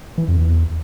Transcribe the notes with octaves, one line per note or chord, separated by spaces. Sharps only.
E3
F2
E2